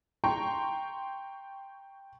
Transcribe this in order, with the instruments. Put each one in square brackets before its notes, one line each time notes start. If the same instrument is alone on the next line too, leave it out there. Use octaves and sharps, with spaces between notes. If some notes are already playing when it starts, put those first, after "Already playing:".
[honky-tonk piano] G5 A#5 C6 C#6